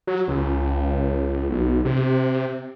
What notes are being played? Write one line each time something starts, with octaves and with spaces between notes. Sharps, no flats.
F#3
C#2
B1
C3